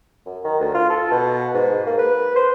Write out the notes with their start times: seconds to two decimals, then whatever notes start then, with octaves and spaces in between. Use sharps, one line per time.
0.26 F#2
0.44 D#3
0.60 D2
0.74 F4
0.90 A4
1.11 B2
1.54 G#2
1.87 A#3
1.99 B4
2.36 C5